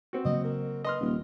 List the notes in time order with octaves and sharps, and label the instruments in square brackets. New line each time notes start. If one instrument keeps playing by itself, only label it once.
[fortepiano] C4 F#4
[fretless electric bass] C#3 F#3 A#3 [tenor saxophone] D#5
[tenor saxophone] A#4
[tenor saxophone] B4 [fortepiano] D#5 C6 F6
[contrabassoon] D#1